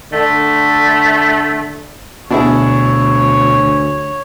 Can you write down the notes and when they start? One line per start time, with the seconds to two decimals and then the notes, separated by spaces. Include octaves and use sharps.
0.13 D3 A3
2.31 D2 B2 D4 E4 G#4 C#5